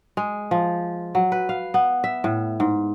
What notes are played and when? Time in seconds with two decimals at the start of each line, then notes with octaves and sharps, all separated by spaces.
0.17 G#3
0.51 F3
1.15 F#3
1.32 B4
1.49 F5
1.74 B3
2.04 E5
2.24 A2
2.60 G#2